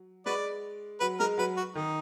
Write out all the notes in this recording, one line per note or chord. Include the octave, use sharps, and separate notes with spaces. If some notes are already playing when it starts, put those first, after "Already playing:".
Already playing: F#3
G#3 F#4 B4 D5
F#3 B4
G#3 A#4
F#3 B4
F#4
D#3 D#4